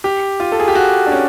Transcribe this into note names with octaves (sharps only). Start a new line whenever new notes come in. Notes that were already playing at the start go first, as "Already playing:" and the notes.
G4
F4
A4
G#4
G4
F#4
D4
C#4